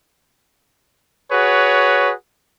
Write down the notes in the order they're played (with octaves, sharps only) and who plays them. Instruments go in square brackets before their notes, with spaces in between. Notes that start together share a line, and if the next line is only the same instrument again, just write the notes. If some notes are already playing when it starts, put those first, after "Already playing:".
[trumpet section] F#4 G#4 B4 C#5